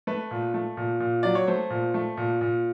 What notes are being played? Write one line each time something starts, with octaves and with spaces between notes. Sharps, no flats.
A3 B4
A#2
A3
A#2
A#2
F#3 D5
C#5
A3 C5
A#2
A3
A#2
A#2